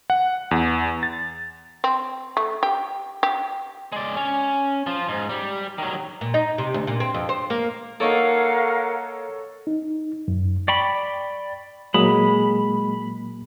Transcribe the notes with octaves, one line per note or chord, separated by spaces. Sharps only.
F#5
E2
A6
C4
A3
G4
G4
G#3 D5
C#4
F3 F4
G#2
G3
D#3 F#3
A#2
D#4
C3
D2
A#2
C4
F2
C5
A#3
A#3 D#4 A4 A#4 C#5 F5 F#5 C#6
D#4
F#2
D5 G5 B5 C#6
A#2 F#3 G#3 A#3 B5